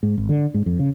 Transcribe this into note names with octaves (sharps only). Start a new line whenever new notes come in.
G#2
G#1
D3
G#2
F2
C#3